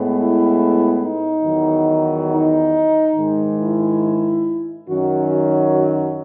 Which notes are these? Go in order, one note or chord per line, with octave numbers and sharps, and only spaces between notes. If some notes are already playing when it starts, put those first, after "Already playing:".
Already playing: A2 G#3 B3
E4
D#4
E2 D#3 F#3
D#4
G#2 D#3 G#3
E4
F#2 D#3 F#3 C#4 F#4
F#4
F#4